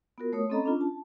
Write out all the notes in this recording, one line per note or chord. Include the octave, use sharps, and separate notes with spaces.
B3 F4 F#4 A#4
A3 C#5 D#6
C4 C#4 A4 D#5 A#5 B5
C#4 D4 F4
A5